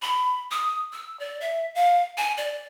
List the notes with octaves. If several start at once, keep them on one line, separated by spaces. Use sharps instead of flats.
B5
D#6
E6
D5
E5
F5
G#5
D5